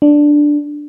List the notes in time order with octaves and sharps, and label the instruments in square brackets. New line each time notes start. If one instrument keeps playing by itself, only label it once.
[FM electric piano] D4